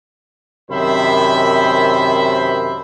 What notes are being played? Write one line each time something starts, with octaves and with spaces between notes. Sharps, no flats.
F#2 C3 D#3 C5 E5 B5